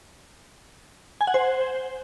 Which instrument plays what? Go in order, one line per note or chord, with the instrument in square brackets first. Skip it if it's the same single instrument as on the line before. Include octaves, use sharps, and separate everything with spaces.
[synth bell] G#5
F#5
C5